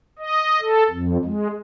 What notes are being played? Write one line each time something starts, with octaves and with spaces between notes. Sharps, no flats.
D#5
A4
F2
G#3